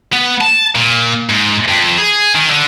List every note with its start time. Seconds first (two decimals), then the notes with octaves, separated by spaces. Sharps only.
0.13 B3
0.41 A5
0.75 A#2
1.29 G#2
1.68 F2
1.98 G#4
2.36 D#3
2.51 D3